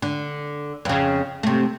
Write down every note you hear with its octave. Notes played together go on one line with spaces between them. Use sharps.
D3
F2 C#3
C3 A3